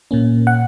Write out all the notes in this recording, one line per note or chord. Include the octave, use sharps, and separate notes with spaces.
A#2 A#3 C#4
F#5